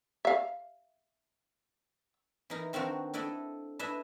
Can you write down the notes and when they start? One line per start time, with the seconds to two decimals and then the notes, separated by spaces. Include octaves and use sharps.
0.25 E5 F5
2.50 E3 D#4 A#4
2.73 D#3 C4 D4 F4 F#4 A#4
3.14 D4 E4 A4 D5 D#5
3.79 D4 E4 B4 D#5 E5